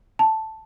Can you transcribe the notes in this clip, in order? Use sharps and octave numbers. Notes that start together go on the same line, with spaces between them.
A5